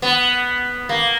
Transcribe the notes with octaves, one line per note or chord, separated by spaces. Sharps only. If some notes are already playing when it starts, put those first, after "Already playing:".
B3
A#3